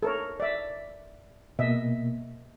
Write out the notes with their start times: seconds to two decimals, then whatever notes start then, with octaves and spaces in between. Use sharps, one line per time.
0.03 A4 A#4 C#5
0.40 D5 E5
1.59 B2 A#3 D#5 E5